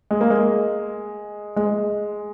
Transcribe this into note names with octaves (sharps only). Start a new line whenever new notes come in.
G#3
A#3
G#3
G#3